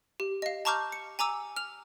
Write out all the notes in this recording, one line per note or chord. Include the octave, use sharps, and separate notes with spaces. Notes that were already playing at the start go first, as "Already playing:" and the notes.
G4
D#5 F5
A5 A#5 C#6 D6 F6 G6
C#7
G#5 A#5 D6 E6
F6 F7